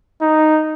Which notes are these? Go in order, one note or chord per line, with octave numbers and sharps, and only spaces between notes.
D#4